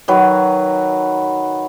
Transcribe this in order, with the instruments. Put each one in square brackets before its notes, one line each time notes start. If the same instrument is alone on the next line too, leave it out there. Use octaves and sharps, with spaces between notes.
[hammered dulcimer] D#3 F#3 B4